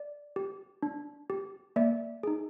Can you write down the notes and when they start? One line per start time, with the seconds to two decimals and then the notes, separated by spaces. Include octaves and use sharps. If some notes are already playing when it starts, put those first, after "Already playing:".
Already playing: D5
0.36 G4
0.82 D4
1.30 G4
1.76 A#3 D5 E5
2.23 D#4 G#4